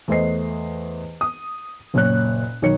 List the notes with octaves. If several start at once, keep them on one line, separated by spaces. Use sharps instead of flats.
E2 A3 C5 D#5 C7
D#6
F#1 A#2 C#5 F#6
B1 D#3 C#5 C#7